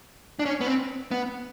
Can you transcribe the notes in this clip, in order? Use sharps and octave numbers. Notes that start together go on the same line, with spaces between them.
D4
C#4
B3
C4
B3